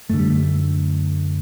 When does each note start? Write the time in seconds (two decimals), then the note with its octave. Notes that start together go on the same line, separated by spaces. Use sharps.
0.10 F#2 D3 A3
0.19 G3
0.30 A3